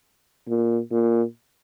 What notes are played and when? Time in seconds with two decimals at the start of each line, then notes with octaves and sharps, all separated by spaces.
0.48 A#2
0.92 A#2